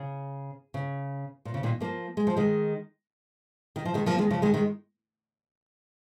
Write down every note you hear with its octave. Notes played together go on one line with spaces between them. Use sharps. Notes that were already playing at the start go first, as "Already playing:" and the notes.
Already playing: C#3
C#3
A#2
C#3
A#2 D#3
F3 A#3
G#3
F3
D#3 G#3
D#3
F3
D#3 G#3
F3 A#3
D#3 G#3
C#3 F3
D#3 G#3
D#3 G#3